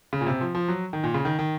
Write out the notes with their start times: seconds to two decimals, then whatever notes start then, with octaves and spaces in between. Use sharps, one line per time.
0.13 C#3
0.21 A#2
0.27 C3
0.41 F3
0.55 F3
0.68 F#3
0.93 D#3
1.04 A#2
1.14 C#3
1.25 D#3
1.39 D#3